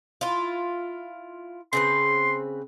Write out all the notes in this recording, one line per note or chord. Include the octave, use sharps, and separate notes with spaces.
E4 F4
C#3 C4 B4 C6